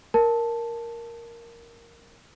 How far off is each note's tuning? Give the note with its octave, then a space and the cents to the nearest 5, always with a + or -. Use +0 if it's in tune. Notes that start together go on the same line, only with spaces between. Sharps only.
A#4 +0 A5 +0